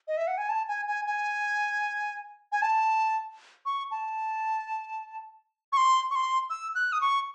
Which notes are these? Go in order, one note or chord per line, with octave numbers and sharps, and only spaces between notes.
D#5
E5
F#5
G#5
A5
G#5
G#5
G#5
G#5
A5
C#6
A5
C#6
C6
C#6
C6
E6
F#6
D#6
C#6